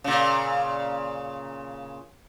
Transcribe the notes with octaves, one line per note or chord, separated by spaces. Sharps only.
A#2 C#3